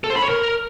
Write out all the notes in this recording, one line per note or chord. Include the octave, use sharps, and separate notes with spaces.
A4
C5
B5
C#5
A#4